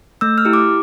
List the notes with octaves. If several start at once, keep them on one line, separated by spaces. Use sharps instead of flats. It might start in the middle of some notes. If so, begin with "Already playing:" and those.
A3 E6
F6
E4 G4
D6